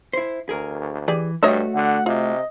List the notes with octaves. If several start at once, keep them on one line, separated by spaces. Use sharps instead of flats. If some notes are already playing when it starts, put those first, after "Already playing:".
E4 C5
D2 G#4 A#4
E3 G4 G#4 D5
G2 A3 F#4 C#5 D#5 E5
D3 F#5
C3 F4 D#5